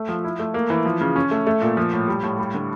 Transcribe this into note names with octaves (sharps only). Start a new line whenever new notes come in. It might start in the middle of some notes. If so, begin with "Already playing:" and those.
Already playing: A3
F3
E4
A3
A#3
E3
F3
C#3
C#4
A3
A3
A#2
F3
A2
G3
A2
G3
D3